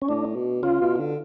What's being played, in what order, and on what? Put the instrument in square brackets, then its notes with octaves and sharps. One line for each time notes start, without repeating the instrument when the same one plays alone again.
[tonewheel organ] C#4
[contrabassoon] A2 [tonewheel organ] D4
[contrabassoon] B2
[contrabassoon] C#3 [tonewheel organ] F4
[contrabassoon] B2
D3